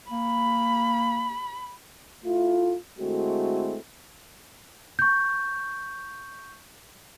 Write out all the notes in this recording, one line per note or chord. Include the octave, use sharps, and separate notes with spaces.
A#3 B5
A3 E4 F4
D3 G#3 A3 C4 E4 F#4
C#6 G6